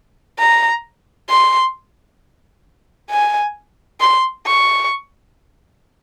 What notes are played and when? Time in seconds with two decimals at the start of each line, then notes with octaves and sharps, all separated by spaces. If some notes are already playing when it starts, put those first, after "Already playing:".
0.39 A#5
1.29 C6
3.11 G#5
4.00 C6
4.47 C#6